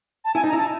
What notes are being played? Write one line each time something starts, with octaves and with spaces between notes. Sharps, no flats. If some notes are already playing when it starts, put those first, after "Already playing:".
A5
E4 G#5
D#4
A#5
E4 A5